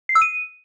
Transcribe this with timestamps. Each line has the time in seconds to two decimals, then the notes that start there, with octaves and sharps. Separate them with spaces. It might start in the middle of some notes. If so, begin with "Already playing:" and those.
0.09 C7
0.15 E6
0.22 D#7